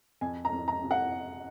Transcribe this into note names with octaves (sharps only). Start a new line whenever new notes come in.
F2 G#5
A#5
F2
A#5
C3
F#5